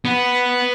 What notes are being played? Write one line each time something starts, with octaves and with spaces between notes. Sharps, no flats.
B3